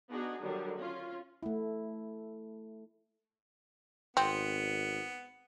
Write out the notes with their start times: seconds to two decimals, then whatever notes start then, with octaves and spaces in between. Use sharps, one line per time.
0.10 B3 D4 D#4 F#4 G#4
0.43 D3 D#3 F#3 G3
0.78 C#4 F4
1.43 A3 E4
4.17 G#1 B3 C4